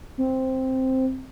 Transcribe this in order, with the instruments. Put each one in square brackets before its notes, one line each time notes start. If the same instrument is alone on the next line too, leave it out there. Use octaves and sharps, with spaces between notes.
[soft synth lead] C4